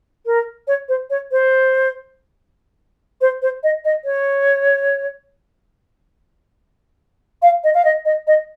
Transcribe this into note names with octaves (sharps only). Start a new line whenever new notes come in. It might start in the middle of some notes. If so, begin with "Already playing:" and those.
A#4
C#5
C5
C#5
C5
C5
C5
D#5
D#5
C#5
F5
D#5
F5
D#5
D#5
D#5